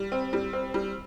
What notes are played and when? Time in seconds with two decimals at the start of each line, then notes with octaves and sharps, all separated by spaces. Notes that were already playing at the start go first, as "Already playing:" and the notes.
Already playing: G3
0.12 C4
0.33 G3
0.53 C4
0.74 G3